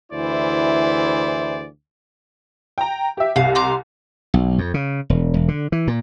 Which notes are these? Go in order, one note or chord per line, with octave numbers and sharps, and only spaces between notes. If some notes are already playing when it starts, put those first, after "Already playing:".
D2 E3 E4 G#4 C5 D5
G5 A#5
G4 E5
C2 F5
A#5 C6 D6
B1
F2
C#3
E1
E1
D3
E3
A#2